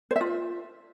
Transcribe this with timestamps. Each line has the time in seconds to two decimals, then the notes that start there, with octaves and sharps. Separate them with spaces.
0.11 C5
0.16 E5
0.21 F4